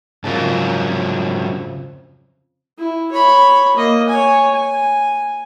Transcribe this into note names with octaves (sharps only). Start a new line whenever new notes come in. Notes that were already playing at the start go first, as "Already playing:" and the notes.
F2 G#2 C#3 F#3 A#4 A5
E4
C#5 B5
A#3 D#5
C#5 G#5
G#5